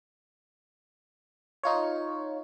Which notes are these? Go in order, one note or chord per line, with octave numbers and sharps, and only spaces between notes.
D#4 F4 C#5